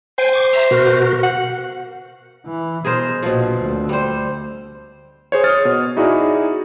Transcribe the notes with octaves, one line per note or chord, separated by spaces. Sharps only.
C5 G5 G#5
C#6 D6
E5 A#5
B2 F#4 A#4
F#5
E3
B2 G#4 A#4 C5
A#1 B2 F3
D2
G3 C5
G#4 C5 C#5
C#5 D#6 F6 A6
B2
D#4 E4 F#4 G#4 D5